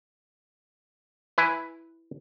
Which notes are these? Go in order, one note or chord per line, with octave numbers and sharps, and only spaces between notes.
E4 B4 G#5